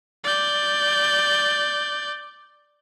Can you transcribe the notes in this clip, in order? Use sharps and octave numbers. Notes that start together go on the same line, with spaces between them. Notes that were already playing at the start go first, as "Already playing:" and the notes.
D5 G6